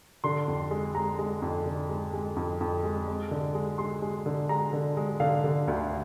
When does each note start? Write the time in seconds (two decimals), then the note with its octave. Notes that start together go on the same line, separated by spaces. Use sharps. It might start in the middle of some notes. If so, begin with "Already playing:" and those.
0.24 D3 C6
0.48 F2
0.71 G#3
0.94 G#3 A#5
1.19 G#3
1.42 F2
1.65 D3
1.90 G#3
2.13 G#3
2.36 F2
2.61 F2
2.84 G#3
3.08 G#3
3.31 D3
3.55 G#3
3.78 G#3 C6
4.02 G#3
4.26 D3
4.49 G#3 A#5
4.73 D3
4.97 G#3
5.20 D3 F5
5.44 D3
5.68 D2